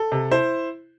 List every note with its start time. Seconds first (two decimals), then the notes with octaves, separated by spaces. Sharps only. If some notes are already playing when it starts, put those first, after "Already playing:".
Already playing: A4
0.12 C3
0.31 E4 C5